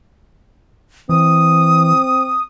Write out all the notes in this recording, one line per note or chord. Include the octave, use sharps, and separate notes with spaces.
E3 C4 D#6